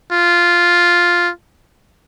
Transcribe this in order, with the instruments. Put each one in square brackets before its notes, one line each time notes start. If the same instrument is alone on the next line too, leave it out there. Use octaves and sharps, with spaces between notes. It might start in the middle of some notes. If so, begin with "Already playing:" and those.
[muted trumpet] F4